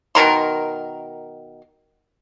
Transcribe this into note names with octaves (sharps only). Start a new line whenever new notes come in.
B2 D#3 A#4 C6